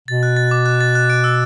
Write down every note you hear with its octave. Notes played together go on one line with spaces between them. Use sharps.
B2 A6
F#6
A6
D6
F#6
A6
F#6
D7
E6